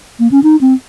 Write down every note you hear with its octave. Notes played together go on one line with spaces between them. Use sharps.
A#3
C#4
D#4
C4